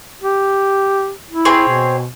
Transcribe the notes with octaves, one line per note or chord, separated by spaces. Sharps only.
G4
E4
C4 G#4 C#5
B2